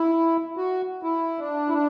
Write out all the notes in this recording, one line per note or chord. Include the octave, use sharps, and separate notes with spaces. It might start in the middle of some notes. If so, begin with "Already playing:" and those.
Already playing: E4
F#4
E4
D4
E4
D4